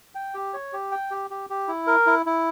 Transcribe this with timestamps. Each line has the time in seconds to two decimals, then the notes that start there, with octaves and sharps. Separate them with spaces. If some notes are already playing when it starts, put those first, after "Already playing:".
0.15 G5
0.34 G4
0.54 C#5
0.73 G4
0.92 G5
1.11 G4
1.30 G4
1.50 G4
1.68 E4
1.87 A#4
2.06 E4
2.26 E4